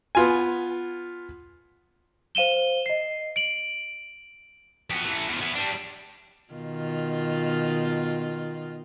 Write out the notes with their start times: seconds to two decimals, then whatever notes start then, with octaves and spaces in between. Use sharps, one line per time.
0.15 B3 F4 G#5
2.35 C5 F5 D#7 E7 G7
2.86 D#5 C7
3.36 D7 F#7
4.90 F2 B3
5.04 E3 A3
5.28 E2 F3
5.41 E3 B3
5.55 G3 D4
6.53 B2 D#3 F4